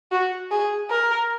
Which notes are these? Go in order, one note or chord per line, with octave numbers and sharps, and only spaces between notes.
F#4
G#4
A#4